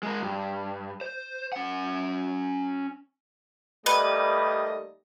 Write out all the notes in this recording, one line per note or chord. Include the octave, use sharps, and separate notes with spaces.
G#3 A#4
G2
C5
C#4 F#5
D#2 G3 A3 B4 D#5